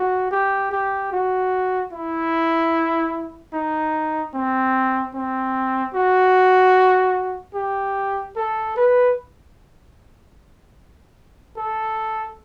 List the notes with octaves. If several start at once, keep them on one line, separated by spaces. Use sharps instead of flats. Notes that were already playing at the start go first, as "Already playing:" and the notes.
Already playing: F#4
G4
G4
F#4
E4
D#4
C4
C4
F#4
G4
A4
B4
A4